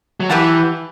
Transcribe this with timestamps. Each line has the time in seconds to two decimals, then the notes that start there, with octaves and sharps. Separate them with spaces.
0.20 F#3
0.30 E3 G4 B4 F#5 A5